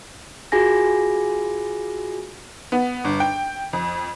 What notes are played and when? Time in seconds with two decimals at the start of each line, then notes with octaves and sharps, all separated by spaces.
0.52 F4 F#4 G#4 G#5 A#6
2.72 B3
3.04 G1
3.20 G5
3.73 F2